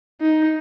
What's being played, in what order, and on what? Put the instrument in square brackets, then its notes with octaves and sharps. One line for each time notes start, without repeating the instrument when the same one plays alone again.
[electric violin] D#4